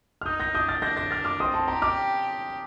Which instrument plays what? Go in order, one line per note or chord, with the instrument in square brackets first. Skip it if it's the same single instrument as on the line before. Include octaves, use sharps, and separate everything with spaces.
[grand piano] F6
[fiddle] D#4 [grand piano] D#6 G6
[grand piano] G6 A#6
[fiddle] D4 [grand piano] D#6 G6
[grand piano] F6 A6
[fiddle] D4 [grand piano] G6 A#6
[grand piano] G6 A#6
F6 A6
D6 F6
[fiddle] C4 [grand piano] C6 D#6
[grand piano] A5 C6
[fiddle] G4 [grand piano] G5 A#5
[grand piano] D6 F6